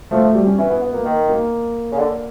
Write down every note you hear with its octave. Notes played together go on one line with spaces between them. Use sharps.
F3 A3
A3
G3
C#4
E3 C#4
B3
B3
A#3
D#3
A#3
C#3
D3